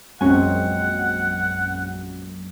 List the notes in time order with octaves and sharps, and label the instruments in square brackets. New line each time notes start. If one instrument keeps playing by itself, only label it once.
[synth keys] A#1 F#2 [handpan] G#3 C4 [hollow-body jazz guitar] C#4 G#5 [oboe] F#5